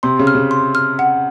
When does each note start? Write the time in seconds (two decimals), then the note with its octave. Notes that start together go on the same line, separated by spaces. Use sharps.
0.03 C3 C6
0.19 C#3
0.27 F6
0.35 C#3
0.51 C6
0.75 F6
0.99 F#5